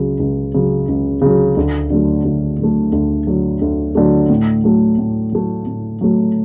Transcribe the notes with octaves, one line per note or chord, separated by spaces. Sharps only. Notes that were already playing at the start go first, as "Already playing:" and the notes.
Already playing: C#2 C#3 F#3
C#2
C#3 F#3
C#2
C#3 F#3
D2
D3 F#3 A3
D2
D3 F#3 A3
D2
D3 F#3 A3
D2
D3 F#3 A3
A2
F#3 A3
A2
F#3 A3
A2
F#3 A3